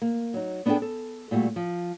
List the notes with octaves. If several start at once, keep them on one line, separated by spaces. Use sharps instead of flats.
A#3
F#3 D#4
B3 D4 F#4 G#4 A4 G5
A4
A#2 G3 A3 F#4
F3